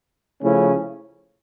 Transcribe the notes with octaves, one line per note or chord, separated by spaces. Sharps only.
C#3 F3 A3 C#4 E4